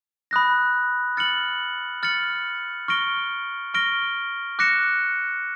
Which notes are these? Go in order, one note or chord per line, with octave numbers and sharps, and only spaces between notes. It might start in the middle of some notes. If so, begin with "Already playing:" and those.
B5 D#6 F#6 A#6
F6 A6 C#7 F#7
F6 A6 C#7 F#7
C#6 F6 A#6 D7 G7
C#6 F6 A#6 D7 G7
D6 F#6 A#6 C#7 E7